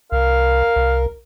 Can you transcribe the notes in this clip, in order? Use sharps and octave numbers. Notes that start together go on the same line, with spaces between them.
C2 A#4 F5
C2